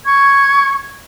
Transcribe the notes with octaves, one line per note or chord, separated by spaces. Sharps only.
C#6 G#6